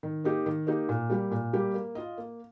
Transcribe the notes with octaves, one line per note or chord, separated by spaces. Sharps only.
D#3
A#3 D#4 G4
D#3
A#3 D#4 G4
A#2
G3 A#3 G4
A#2
G3 A#3 G4
A#3
F4 D#5
A#3